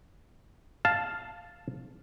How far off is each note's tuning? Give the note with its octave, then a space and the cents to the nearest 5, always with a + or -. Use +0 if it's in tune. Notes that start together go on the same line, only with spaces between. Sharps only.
F5 +0 A5 +0